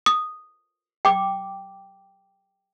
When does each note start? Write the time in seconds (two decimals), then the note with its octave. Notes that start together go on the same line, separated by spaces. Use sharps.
0.06 D#6
1.05 G5 D6